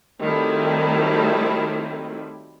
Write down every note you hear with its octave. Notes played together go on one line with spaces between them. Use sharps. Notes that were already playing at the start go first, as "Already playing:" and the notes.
D#3 F#3 G3 A3 C4 E4